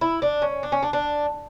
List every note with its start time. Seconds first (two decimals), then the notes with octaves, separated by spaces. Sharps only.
0.01 E4
0.22 D4
0.42 C#4
0.63 D4
0.72 C#4
0.83 D4
0.93 D4